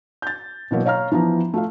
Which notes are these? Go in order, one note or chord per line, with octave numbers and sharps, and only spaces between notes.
G6 A6
B2 E3 F#3 A#3
C#5 F5 A#5 F6
E3 F3 B3 A#5
A3 F4 F5